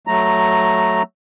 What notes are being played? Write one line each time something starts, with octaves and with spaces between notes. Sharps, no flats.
F#3 A3 A#5